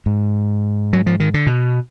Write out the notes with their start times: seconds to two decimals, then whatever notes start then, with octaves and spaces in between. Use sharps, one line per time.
0.06 G#2
0.93 F#3
1.06 F3
1.20 D#3
1.34 D3
1.47 B2